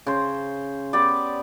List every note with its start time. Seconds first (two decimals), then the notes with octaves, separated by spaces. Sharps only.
0.06 C#3 C5
0.93 B3 G4 D5